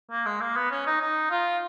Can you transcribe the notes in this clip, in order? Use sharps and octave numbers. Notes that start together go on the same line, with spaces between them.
A#3
G#3
A#3
B3
C#4
D#4
D#4
F4